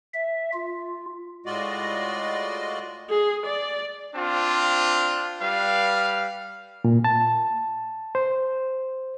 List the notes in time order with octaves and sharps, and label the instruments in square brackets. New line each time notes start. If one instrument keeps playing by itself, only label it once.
[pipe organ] E5
F4
[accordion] A2 G#3 F4 F#4 D5 D#5
[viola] G#4
D5
[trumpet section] C4 D4 F4
G3 B4 F5
[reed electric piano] A#2
A5
C5